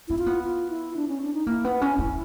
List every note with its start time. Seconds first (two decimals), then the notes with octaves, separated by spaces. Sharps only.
0.08 C4 E4
0.19 F4
0.26 B3
0.43 F4
0.70 E4
0.96 D4
1.08 C#4
1.22 D4
1.34 D#4
1.47 A#3 E4
1.64 B3
1.82 C#4
1.98 C#4